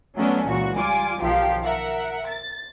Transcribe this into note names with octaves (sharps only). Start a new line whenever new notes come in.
F#3 A3 B3 C#4 D4
C#2 A#2 E3 F#4
G3 F4 G#5 D6
B1 D#3 F3 G4 F5
A#4 E5 F#5
A6